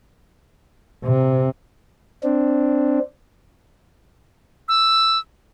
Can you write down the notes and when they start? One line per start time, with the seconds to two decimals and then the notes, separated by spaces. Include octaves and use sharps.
1.05 C3
2.23 C4 D4
4.68 E6